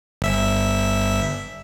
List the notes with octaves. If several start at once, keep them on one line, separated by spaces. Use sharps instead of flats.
G1 E5